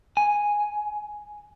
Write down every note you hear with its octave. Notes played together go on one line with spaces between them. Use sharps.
G#5